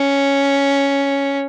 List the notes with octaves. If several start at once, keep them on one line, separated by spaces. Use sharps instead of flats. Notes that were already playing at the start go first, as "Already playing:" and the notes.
Already playing: C#4